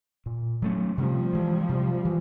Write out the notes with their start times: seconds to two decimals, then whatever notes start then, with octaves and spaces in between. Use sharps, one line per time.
0.26 A#2
0.62 F#3 A3 C#4
0.97 C3 F3 G3
1.33 E3 G#3
1.69 C3
2.05 E3